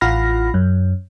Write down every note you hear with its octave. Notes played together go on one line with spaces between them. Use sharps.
A1 F4 F#5 B5 F6 A#6
F#2